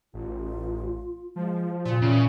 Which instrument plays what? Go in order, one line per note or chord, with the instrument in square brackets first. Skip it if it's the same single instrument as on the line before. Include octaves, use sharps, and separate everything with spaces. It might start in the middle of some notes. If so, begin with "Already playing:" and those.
[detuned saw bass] A1 [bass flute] F4
[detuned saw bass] F3 [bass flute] G#3
[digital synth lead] A#2 [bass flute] C#3
[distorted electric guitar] C#3 [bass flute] E3